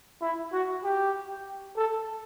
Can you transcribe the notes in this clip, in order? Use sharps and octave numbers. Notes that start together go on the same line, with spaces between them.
E4
F#4
G4
A4